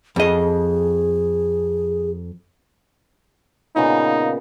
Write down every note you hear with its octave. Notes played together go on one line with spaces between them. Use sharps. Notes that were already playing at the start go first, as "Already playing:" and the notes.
F2 G#4 D#5
A#2 C#3 B3 D#4